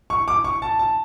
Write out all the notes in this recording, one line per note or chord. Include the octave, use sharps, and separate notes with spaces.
C#6
D6
C#6
A5
A5